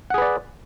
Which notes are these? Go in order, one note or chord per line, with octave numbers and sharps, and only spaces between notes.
G#4 B4 D5 F#5